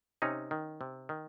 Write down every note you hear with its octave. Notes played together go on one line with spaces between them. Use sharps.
C3 C#4 D#4
D#3
C3
D#3